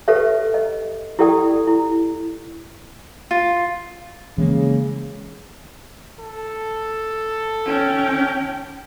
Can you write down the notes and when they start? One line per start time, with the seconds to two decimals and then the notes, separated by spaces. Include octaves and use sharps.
0.08 G4 A4 B4 C#5 E5
0.54 D#5
1.19 E4 G4 A4 D5 G5 D#6
1.67 E4
3.31 F4
4.38 C#3 E3 G#3 A#3
6.20 A4
7.66 C#4 G5